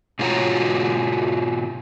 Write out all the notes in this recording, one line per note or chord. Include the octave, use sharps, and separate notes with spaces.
G#2 B2 F4 F#4 C#5 A#5